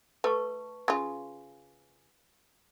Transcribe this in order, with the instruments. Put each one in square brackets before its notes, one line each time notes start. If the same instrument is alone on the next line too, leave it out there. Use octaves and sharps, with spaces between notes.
[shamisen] A3 [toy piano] B4 A5 C#6
[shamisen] C#3 F4